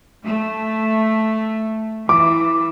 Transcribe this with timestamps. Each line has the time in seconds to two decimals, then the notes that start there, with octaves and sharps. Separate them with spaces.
0.22 A3
2.09 E3 D6